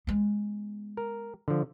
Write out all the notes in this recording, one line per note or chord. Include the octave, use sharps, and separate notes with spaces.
G#3 B3
A#4
D3 F3